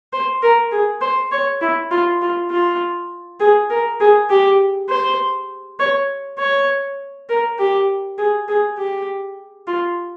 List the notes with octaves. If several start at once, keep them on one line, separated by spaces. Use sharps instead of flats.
C5
A#4
G#4
C5
C#5
E4
F4
F4
F4
G#4
A#4
G#4
G4
C5
C#5
C#5
A#4
G4
G#4
G#4
G4
F4